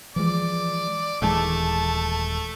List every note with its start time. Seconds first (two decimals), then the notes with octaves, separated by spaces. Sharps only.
0.16 E3 F3 G#3 D5
1.22 D#1 E3 G#3 A3 A5